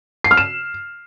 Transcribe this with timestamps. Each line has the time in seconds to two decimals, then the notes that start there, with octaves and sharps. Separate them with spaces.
0.24 C7
0.31 F6
0.37 E7